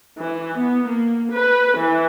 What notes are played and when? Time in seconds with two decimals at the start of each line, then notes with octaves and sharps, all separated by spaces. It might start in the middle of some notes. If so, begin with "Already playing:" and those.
0.19 E3
0.58 B3
0.89 A#3
1.32 B4
1.78 E3